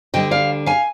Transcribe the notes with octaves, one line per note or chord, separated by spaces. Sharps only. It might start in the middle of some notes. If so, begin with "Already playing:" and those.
D2 D3 G3 D#5 G5
D5 F5
F5 G#5